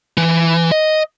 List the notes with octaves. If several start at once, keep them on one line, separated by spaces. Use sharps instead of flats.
E3
D#5